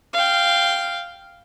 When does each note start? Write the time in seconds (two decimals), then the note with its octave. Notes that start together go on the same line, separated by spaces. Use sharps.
0.14 F5 G5